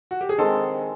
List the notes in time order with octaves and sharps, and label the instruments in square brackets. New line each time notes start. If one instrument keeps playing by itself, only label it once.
[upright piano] F#4
G4
G#4
[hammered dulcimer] D#3 G#3 C4 [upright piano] A4